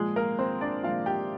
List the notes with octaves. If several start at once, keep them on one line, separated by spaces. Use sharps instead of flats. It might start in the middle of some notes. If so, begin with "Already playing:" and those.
Already playing: A#2 F3 G#3 G#4
A#3 A#4
C4 C5
D4 D5
A#2 F3 G#3 F4 F5
G4 G5